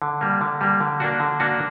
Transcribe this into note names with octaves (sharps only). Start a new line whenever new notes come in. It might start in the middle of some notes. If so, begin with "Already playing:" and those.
D3
G3 A#3
D3
G3 A#3
D3
A#3 D4 F#4
D3
A#3 D4 F#4